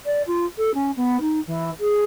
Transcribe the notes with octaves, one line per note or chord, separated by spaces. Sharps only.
D5
F4
A4
C#4
B3
D#4
E3
G#4